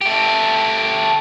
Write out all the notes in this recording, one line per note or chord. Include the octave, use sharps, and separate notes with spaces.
A3 G4